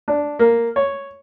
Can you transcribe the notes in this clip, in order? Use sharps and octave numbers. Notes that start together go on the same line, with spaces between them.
D4
A#3
C#5